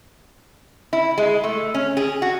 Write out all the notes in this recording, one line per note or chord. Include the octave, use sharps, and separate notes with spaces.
E4
G#3
A3
C#4
G#4
F#4